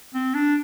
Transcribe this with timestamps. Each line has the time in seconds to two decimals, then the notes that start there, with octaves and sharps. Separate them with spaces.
0.14 C4
0.34 D4